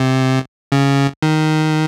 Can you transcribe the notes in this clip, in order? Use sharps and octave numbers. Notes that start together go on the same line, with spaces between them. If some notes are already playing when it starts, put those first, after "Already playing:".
Already playing: C3
C#3
D#3